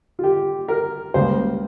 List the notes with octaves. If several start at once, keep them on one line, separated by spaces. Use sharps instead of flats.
F4
G4
A#4
C#2 C#3 G3 A#3 C5